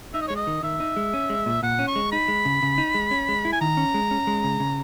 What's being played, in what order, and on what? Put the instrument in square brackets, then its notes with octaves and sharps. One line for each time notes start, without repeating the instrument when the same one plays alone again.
[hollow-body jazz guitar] D#4 [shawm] E5
[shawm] D#5
[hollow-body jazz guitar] G#3 [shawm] C#5
[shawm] D#5
[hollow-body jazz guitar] D#3
[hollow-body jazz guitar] D#3 [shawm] E5
[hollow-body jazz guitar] D#4
G#3
C#4
G#3
A#2
[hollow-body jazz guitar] A#2 [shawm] F#5
[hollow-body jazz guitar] C#4
[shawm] C#6
[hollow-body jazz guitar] G#3
[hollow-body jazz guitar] D#4 [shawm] B5
[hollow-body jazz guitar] G#3
C#3
C#3
D#4
G#3
C#4
G#3
E4
[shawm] G#5
[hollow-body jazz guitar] D#3 [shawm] A#5
[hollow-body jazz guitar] C#4
G#3
C#4
G#3
C#3
C#3